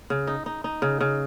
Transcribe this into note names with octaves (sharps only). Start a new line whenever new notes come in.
C#3
D#4
D#4
D#4
C#3
C#3